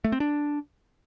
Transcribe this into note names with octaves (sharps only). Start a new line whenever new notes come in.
A3
C4
D4